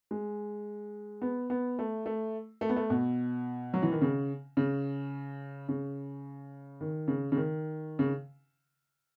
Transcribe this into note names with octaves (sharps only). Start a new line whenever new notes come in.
G#3
B3
B3
A3
A3
A3
B3
A3
B2
F#3
E3
D#3
C#3
C#3
C#3
D#3
C#3
C#3
D#3
C#3